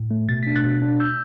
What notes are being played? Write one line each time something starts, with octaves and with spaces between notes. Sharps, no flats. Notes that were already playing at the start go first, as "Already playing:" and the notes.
Already playing: A2
A3
B2 A6
D4 B6
F#6 A6
B2
D4
E6 G6